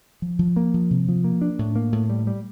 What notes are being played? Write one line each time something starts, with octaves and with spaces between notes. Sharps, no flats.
F3
F3
A#3
F3
C3
F3
A#3
D4
A2
A#3
A2
G3
G3